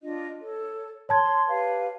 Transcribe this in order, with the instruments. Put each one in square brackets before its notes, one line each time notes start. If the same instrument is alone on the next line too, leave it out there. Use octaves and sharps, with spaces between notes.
[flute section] D4 F4 D#5
A4 C#5
[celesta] C#5 A5 G#6 [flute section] C6
[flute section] G4 B4 F5